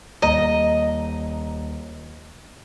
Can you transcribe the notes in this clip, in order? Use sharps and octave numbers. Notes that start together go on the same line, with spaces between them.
D#1 D#5 A#5